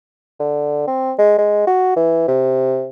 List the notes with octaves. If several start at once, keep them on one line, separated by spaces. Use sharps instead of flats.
D3
C4
G#3
G#3
F#4
E3
C3